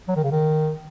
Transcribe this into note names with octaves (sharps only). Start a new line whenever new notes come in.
F#3
D#3
C#3
D#3